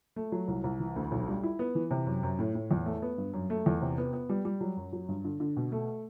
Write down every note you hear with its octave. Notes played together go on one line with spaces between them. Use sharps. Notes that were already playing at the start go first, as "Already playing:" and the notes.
A3
F#3
C2
C2
E3
D2
B1
G3
E4
B3
E3
C3
F#2
F#2
A2
A2
E2
A3
B3
G2
F#2
A3
E2
C3
B3
B3
G3
G3
F#3
F#2
F#3
G2
D3
D3
B2
A3